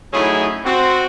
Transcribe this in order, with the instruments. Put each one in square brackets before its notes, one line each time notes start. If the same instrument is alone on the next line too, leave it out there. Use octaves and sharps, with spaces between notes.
[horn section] A2 F#3 C#4 D#4 E4 G#4
C4 F#4